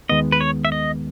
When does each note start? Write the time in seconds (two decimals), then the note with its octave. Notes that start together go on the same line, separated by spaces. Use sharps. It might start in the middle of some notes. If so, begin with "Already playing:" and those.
0.09 D#2 D#3 G#3 B3 D#5
0.32 B4
0.41 C#5
0.65 E5
0.72 D#5